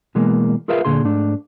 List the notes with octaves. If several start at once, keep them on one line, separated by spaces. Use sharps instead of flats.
B2 E3 G#3 A#3
F4 G#4 A#4 B4 E5 F5
D2 A#2 D3 G#4 C6
G#2 A3 D4